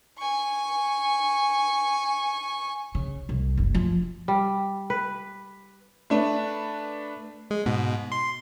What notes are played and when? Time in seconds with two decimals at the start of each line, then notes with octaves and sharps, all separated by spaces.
0.18 G#5 C#6
2.95 C#3
3.29 C2
3.57 F#1
3.75 F3
4.28 G3
4.90 B4
6.10 A3 D4 B4
7.51 G#3
7.66 G#2 B2
8.12 C6